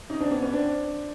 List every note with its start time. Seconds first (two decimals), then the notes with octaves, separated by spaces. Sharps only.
0.10 C#4 D#4
0.21 C4 D4
0.31 B3 C#4
0.42 B3 C#4
0.53 C4 D4